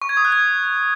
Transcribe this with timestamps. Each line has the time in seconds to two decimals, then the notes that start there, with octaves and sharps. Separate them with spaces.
0.02 C#6
0.09 G#6
0.17 D#6
0.25 F#6
0.32 G#6